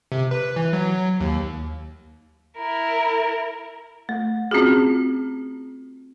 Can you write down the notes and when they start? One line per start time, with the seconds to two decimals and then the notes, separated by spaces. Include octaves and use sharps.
0.12 C3
0.31 B4
0.56 E3
0.73 F#3
1.20 D#2
2.58 E4 A#4
4.09 A3
4.51 C4 C#4 F4 F#4 G#4